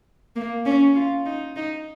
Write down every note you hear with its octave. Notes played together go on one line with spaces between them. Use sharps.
A#3
C#4
F4
D#4
D#4